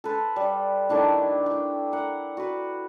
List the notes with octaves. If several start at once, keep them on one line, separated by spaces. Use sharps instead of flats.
A4 B4 C5
G3
D#3 A3 D4 E4
E4 G5
A#4 F#5
F#4 B4